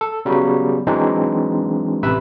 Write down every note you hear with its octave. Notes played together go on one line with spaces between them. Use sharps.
A4
C#3 F#3 G3 B3
E3 F#3 G#3 C4 D4 D#4
A1 C3 B4 E5 E6